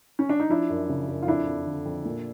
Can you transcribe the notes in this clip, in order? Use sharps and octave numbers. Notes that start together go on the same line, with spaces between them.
C#4
D4
D#4
F3 D4 E4
F#2
C#3
F#2
F4
F2 D4 E4
F2
D3
F2
A#2